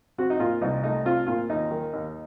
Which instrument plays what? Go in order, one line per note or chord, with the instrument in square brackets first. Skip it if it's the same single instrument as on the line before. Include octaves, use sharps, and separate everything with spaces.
[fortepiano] C4 F#4
D#4
A#2 F4
C2 D#4
A3 D#4
C4 F4
A#2 F4
D#2 D#4
D#3
D#2